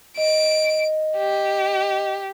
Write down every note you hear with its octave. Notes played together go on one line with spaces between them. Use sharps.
D#5 D7
G4